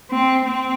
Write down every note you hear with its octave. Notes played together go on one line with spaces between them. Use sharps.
C4
C4